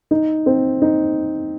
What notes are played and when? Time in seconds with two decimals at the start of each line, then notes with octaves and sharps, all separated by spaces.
0.11 D#4
0.46 C4
0.82 D#4